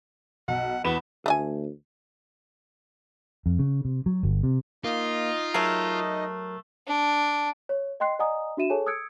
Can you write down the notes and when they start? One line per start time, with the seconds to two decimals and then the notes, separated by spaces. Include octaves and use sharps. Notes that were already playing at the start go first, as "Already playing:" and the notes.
0.48 B1 F#5
0.84 E2 B3 B5 E7
1.26 D2 A3 D#5 G#5
3.46 F2
3.59 C#3
3.85 C3
4.06 F#3
4.23 G1
4.43 C3
4.84 A#3 D#4 F4 D#5
5.54 F#3 A3 G#4 A#4 C7
6.87 D4
7.69 C#5
8.00 D#5 G5 C6 F#6 C7
8.19 D5 D#5 F#5 G#5 A#5 D#6
8.57 D4 F#4 E5 D#7 E7
8.70 G#4 A4 C#5 G#5 A5
8.86 D#6 E6 F#6 G#6 C#7 D7